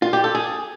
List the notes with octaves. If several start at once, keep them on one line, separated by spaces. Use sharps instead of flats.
F4
G4
A4
G#4